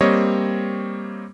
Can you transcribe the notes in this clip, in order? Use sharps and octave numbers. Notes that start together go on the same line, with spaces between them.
G3 A#3 C4 C#5 D#5